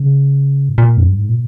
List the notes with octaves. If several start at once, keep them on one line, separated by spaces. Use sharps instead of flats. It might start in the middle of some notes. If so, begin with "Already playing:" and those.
Already playing: C#3
G#2
A#2
F2
G2
G#2
A#2